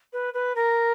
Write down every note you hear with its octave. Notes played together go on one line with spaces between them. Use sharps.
B4
B4
A#4